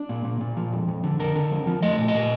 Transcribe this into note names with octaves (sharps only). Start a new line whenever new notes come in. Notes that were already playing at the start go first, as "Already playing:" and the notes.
Already playing: D4
A#2
A#2
A#2
F3
F2
F2
D3
D3 A#4
D3
F2
F3
A3 D#5
A#2
D#5
A#2